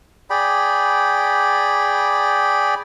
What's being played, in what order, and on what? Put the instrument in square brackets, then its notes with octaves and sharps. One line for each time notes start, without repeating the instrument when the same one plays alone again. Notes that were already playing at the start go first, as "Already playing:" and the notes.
[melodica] G#4 D5 G5 B5